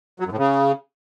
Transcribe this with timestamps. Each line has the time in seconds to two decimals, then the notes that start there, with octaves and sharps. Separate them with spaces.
0.20 F#3
0.26 F#2
0.32 A2
0.38 C#3